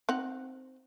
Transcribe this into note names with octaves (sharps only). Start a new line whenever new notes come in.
C4 D#4 F#5